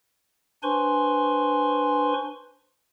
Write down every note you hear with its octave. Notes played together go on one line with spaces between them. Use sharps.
D4 B4 C5 G#5 C6 C#6